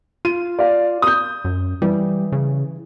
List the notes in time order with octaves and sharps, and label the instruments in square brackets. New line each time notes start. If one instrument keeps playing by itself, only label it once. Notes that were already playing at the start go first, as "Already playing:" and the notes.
[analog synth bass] F4 [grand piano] D#7
[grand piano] D5 F5
D#6 G6
[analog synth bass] F#2
[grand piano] E3 [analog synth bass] G3
[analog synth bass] C#3